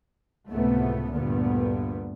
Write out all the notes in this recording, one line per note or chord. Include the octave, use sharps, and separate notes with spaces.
C#2 A2 C3 A3 B3
D2 G2 A#2 D3 B3